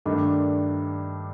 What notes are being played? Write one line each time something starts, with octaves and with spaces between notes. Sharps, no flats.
G2 D#3 A3 D4